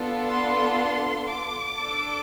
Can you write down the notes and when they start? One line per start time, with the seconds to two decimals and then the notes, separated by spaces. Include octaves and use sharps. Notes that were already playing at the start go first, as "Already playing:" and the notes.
Already playing: B3 D4 F4 A4
0.28 C6
1.28 D6
1.77 D4 A4